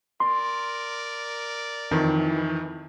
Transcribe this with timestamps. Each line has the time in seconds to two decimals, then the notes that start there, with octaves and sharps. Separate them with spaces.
0.20 A#4 D5 C6
1.91 F2 D#3 E3